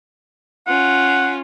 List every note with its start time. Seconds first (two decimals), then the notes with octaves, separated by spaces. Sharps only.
0.67 C#4 F4 F#5